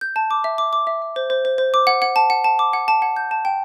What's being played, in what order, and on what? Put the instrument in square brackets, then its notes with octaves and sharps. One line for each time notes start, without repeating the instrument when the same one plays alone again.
[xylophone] G6
A5
D6
E5
D6
D6
E5
E5
C5
C5
C5
C5
D6
F#5
F#5
A5
F#5
A5
D6
F#5
A5
F#5
G6
A5
G5